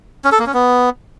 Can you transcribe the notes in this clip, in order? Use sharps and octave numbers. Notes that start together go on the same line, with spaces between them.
C#4
A4
A#3
C#4
B3